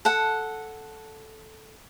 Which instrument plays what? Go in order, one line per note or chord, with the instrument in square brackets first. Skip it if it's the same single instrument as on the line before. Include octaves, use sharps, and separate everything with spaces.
[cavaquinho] A4 F#5